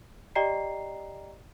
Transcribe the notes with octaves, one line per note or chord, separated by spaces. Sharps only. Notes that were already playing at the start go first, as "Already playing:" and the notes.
G4 D5 D#5 G5 A#5 C7